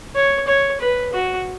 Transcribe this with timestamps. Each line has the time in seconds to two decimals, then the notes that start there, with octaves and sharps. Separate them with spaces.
0.15 C#5
0.47 C#5
0.80 B4
1.13 F#4